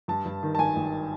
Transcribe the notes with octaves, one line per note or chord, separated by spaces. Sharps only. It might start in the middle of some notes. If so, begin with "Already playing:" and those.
G2 A5
G2
D#3
A5
G#1 G#5
G#1